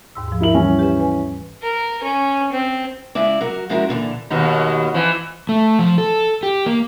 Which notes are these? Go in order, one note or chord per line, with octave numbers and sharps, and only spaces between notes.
D#2 G#2 E6
G#2 F3
E4 A#4 F#7
E3 G3 C#4
G4 B4 E5
B4 G#5
A#4
C#4
C4
C#3 G#3 E4 D5
F#3 F#4 A#4
F3 G#3 C#4 E4 F#4 A#4
A#2 D3 E3 D4
D#2 B2 D#4
E3 F3
A3
F3
A4
G4
A#3